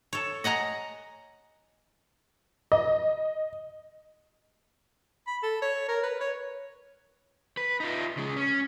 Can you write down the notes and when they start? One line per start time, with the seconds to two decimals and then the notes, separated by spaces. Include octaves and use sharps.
0.13 A4 C#5
0.44 D#5 F#5 G#5 A#5
2.72 D#5
5.27 B5
5.42 A4
5.62 C#5
5.88 A#4
6.03 B4
6.20 C#5
7.57 B4
7.80 D#4 F4
8.17 C#3 G#3
8.36 C#4